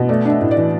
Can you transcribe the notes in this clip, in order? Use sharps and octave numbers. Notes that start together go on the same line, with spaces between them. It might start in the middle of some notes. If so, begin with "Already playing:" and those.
Already playing: B2
A3 D5
D4 E5
A2
D5
E3